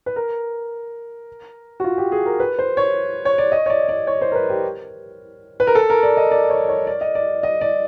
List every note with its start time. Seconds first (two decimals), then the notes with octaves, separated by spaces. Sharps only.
0.06 B4
0.16 A#4
1.80 F#4
1.84 F4
1.98 G4
2.12 G#4
2.26 A#4
2.40 B4
2.59 C5
2.77 C#5
3.25 C#5
3.38 D5
3.52 D#5
3.66 C#5
3.70 D5
3.89 D5
4.07 C#5
4.21 C5
4.32 A#4
4.35 B4
4.50 G4
5.60 B4
5.67 A#4
5.75 A4
5.90 A#4
6.03 D5
6.17 D#5
6.31 D5
6.50 C#5
6.69 C#5
6.87 D5
7.01 D#5
7.15 D5
7.43 D#5
7.61 D5